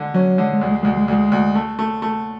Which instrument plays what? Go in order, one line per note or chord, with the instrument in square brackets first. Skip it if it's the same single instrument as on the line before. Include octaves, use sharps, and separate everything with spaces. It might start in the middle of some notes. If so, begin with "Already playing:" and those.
Already playing: [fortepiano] D3 G#3
[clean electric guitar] F#3 [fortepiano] C#4
[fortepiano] D3 [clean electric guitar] G#3
[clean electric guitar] G#3
[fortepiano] D2
[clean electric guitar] G#3
[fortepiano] D2 [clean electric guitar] G#3
[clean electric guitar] G#3
[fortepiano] D2 [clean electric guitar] G#3
[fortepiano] D2
A3
A3
A3